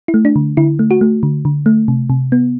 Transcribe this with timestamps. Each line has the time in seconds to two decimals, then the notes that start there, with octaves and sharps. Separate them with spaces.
0.08 E4
0.14 A3
0.25 D4
0.36 D3
0.57 D3 E4
0.79 A3
0.91 F#4
1.01 A3
1.23 D3
1.45 D3
1.66 A3
1.88 C3
2.10 C3
2.32 B3